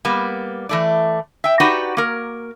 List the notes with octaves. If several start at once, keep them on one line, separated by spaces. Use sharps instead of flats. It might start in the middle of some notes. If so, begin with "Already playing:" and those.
G3 A#3 B3
E3 A3 D5
E5 G5
D#4 F#4 G4 B4 D5 F#5
A#3 A#4